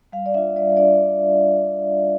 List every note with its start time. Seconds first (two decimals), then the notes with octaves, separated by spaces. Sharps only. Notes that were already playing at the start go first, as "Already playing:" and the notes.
0.12 G3 F5
0.26 D5
0.34 D4 F4 E5
0.56 G3 D5
0.77 D4 F4 D5